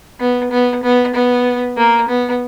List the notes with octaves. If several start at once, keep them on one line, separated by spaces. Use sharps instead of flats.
B3
B3
B3
B3
A#3
B3